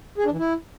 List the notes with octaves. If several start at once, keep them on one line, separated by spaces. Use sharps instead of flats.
G#4
D4
E3
E4